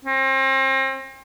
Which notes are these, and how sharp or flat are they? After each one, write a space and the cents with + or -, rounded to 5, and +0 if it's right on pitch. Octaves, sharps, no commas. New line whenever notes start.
C4 +35